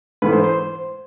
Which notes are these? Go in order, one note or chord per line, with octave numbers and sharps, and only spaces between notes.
G#2 E3 A3 B4
C5
C5